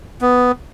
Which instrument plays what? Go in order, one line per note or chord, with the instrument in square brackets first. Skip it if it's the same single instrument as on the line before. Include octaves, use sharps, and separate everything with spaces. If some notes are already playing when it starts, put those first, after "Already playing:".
[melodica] B3